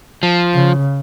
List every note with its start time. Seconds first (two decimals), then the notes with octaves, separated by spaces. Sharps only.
0.23 F3
0.54 C#3